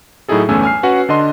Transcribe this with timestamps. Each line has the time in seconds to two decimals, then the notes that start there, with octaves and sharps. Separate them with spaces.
0.28 A2 F#3 D#4 E4 G#4 A4
0.49 G1 E2 A3 C#4 G#5 E6
0.63 G#5 F6 C7
0.83 C#4 F#4 B4 F#5
1.09 D3 D4 D#5 C6